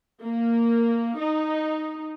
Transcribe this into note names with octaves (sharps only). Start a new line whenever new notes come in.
A#3
D#4